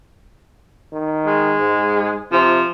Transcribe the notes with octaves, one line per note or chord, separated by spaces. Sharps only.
D#3
G#3
G#2
C3 F3